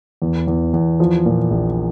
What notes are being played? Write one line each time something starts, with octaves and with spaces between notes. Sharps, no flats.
E2
E2
E2
F3
A#2
A#1